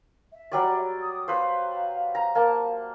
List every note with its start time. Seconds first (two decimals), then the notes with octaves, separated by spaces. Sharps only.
0.32 E5
0.52 F#3 G3 D5
1.01 D#6
1.28 B4 C5 F5
2.15 A#5
2.35 A#3 A5